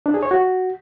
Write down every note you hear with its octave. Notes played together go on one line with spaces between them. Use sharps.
D4
G#4
C#5
F#4